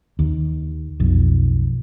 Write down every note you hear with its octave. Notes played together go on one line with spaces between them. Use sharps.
D#2
B1 F2